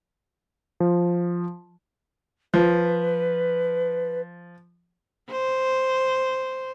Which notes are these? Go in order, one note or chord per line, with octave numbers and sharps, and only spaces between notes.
F3
F3 B4
C5